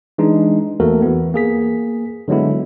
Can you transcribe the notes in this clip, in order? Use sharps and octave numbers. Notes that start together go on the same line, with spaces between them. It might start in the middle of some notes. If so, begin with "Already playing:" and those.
E3 G#3 D4 D#4
E2 A3 A#3 F#4 A4 A#4
E3 B3
A#3 G#4 B6
D3 F#3 G#3 B3 E4